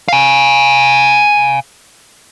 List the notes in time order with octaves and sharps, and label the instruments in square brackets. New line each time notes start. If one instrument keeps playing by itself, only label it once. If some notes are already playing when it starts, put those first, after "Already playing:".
[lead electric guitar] F5 G#5